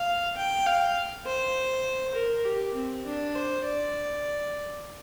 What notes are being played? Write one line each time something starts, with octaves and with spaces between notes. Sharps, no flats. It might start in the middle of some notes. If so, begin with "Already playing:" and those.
Already playing: F5
G5
F5
C5
A#4
G4
C4
D4
C5
D5